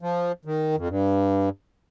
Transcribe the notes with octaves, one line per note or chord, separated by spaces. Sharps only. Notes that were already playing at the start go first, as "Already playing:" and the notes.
F3
D#3
F2
G2